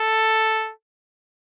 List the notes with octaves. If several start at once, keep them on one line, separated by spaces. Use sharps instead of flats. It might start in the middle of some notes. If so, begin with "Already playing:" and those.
Already playing: A4